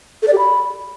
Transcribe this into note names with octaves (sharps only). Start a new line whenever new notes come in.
A4
D5
G4
B5